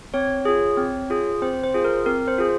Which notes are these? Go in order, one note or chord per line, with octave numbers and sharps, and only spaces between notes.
C4 C#5
F4 G#4
C4
F4 G#4
C4 C5
C5
F4 G#4
A#4
C4 A#4
C5
F4 G#4